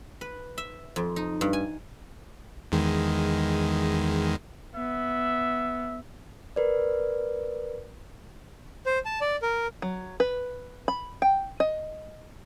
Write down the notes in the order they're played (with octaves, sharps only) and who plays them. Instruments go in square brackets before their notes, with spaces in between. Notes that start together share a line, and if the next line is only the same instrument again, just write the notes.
[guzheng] B4
E5
F2
D#4
G2
G#5
[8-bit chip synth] E2 D#3 G#3
[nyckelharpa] B3 [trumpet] E5
[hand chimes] A#4 B4 D5
[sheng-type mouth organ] C5
A5
D5
A#4
[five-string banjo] F#3
B4
B5
G5
D#5